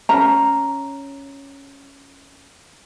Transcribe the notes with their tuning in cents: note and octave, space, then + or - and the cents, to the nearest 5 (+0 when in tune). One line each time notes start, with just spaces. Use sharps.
C#4 +0 A#5 +0